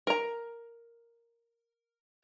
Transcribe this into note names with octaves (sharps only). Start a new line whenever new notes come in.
A#4 A#5